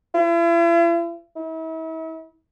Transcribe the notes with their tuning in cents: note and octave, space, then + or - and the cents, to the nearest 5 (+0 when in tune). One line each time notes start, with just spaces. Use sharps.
E4 +45
E4 -40